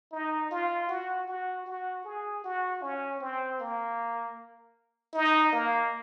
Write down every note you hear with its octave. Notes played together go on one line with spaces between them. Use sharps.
D#4
F4
F#4
F#4
F#4
G#4
F#4
C#4
C4
A#3
D#4
A#3